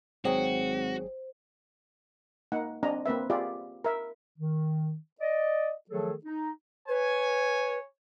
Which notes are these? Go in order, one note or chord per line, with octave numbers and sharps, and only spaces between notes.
G#1 F#3 F#4 G#4 C5 G5
A#3 D#4 F#5
C4 D4 D#5 A#5
A#3 C4 B4 E5
F4 G4 G#4 D5 E5
A#4 E5
D#3
D5 D#5
D#3 F3 F#3 A3 G#4 A4
D#4
B4 C#5 G#5